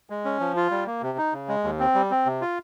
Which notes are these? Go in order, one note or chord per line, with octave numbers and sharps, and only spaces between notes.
G#3
C#4
F3
F4
G3
A#3
C3
D#4
C#3
G#3
D#2
C4
G3
C4
C3
F4